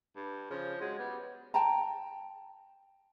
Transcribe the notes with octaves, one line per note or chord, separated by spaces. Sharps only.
G2
C#3 F3
F#3 G#3
G3 B3
G5 A5 A#5